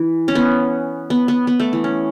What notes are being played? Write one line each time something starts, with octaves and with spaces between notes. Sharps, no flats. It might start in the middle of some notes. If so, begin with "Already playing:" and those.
Already playing: E3
C#4
B3
B3
B3
B3
A3
E3
C#4